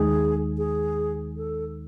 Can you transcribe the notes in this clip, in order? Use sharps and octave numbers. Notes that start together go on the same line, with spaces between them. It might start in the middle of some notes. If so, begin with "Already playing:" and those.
Already playing: D#2 D#3 G#3 D#4 G#4
G#4
A4